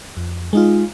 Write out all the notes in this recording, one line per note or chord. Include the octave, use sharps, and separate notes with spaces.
F2
G#3 D#4 F4